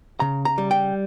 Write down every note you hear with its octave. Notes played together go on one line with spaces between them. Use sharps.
C#3 A#5
A#5
G3
G5